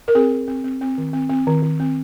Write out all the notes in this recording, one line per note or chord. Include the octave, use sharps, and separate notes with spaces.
A#4
C4 G#4
C4
C4
C4
C4
D#3
C4
C4
D#3
D#3
C4